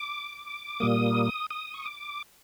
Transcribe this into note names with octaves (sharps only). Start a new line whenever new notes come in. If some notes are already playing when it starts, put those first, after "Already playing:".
Already playing: D6
A#2 G3 A#3 D#6
D#6
C#6
D6